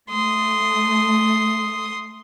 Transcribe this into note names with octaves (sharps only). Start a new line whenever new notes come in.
A3 C6 D#6